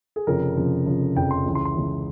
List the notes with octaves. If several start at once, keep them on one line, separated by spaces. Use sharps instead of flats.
G#4
F1 F2 C#3 F3 A#4
F1 F2 C#3 F3
F1 F2 C#3 F3
F1 F2 C#3 F3 G5
C6
C#2 C#3 E3
C6
C6
C#2 C#3 E3